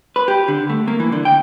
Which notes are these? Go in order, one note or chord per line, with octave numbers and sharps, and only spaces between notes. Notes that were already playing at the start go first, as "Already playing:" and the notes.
B4
G4
D3
A3
A#3
E3
D3
G5